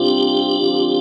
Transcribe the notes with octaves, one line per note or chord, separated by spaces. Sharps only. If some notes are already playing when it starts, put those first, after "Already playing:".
Already playing: C3 G3 C4 D4 F4 G4
D3 F3 C4 F4